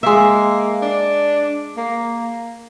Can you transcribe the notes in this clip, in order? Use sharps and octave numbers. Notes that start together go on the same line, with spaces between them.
G#3 A#3 E5
D4
A#3